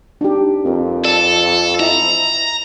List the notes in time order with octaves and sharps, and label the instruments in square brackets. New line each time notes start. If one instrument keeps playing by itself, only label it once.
[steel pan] D4 D#4 G4
[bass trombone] F2 [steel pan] C4 A#4
[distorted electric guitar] A4 [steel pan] D5 A5
[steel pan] E4 D#5 E5 [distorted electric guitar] A#5